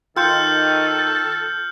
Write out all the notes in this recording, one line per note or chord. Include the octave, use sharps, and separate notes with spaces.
D#3 F4 A4 G5 C6 F6 G6 C#7